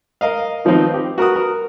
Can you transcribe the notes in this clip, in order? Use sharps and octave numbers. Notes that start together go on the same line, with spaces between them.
A#4 D#5 F5
D#3 F3 B3 C4 D#4
G4
F#4 A#4 B4 D#6
A#4